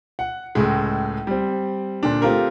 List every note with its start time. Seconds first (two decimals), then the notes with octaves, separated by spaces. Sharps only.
0.19 F#5
0.55 C#2 A2 G#3
1.27 G3 C4
2.03 A#2 D3 D4
2.22 A3 C4 F4 G4 A#4